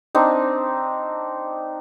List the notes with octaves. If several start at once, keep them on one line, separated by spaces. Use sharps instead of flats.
C4 D4 D#4